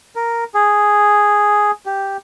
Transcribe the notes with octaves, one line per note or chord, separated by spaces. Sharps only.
A#4
G#4
G4